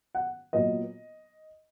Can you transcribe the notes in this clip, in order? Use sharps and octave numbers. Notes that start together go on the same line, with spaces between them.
F#5
A#2 F#3 B3 D#5